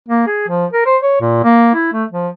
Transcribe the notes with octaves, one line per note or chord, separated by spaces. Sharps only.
A#3
G#4
F3
A#4
C5
C#5
A#2
A#3
E4
A3
F3